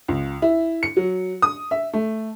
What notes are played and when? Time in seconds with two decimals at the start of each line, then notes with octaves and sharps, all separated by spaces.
0.08 C#2
0.42 E4
0.83 C#7
0.97 F#3
1.42 D#6
1.71 E5
1.93 A3